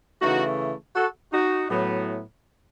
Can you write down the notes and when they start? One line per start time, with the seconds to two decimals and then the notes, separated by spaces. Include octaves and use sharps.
0.21 C#3 E3 A3 D#4 F#4
0.95 F#4 A4
1.32 D#4 F#4
1.69 A2 F#3 B3